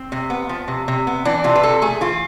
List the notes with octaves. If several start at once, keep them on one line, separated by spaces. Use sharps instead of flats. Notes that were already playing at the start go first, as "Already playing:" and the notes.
Already playing: C4
C3
B3
F3
C3
C3
B3
E3 D4
C3 F4
B4
C3 A4
A3 G#4
E3 F4